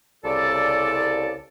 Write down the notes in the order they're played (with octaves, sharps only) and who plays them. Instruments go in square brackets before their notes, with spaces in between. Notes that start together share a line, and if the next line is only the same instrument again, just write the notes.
[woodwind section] C2 C#3 A4 D5